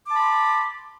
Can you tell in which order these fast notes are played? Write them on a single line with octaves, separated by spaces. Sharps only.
D6 A5 B5 C6